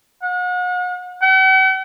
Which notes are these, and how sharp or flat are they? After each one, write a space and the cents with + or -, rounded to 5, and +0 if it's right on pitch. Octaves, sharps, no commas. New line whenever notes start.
F#5 -40
F#5 +45